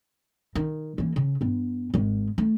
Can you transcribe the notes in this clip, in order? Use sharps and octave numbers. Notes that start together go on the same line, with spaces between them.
D#3
E3 A#3
C#3
G2 B3
G#1 G#3
A3